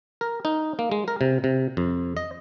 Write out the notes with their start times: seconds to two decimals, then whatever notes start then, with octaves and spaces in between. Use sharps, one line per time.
0.21 A#4
0.45 D#4
0.79 A#3
0.92 G#3
1.08 A#4
1.21 C3
1.44 C3
1.77 F2
2.17 D#5